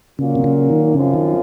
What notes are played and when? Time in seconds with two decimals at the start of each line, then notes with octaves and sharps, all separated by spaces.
0.19 A#2 C#3 F#3 A#3 F4
0.35 C3
0.44 C#3
0.69 D#3
0.94 F#2 C#3 F3 C4 F4
1.14 D#3